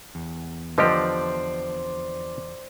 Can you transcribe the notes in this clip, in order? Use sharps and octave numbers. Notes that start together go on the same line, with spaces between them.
E2
D3 F3 G4 C5 D5 D#5